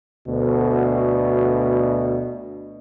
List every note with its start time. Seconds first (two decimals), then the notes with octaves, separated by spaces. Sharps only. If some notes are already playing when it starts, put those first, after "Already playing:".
0.28 D2 B2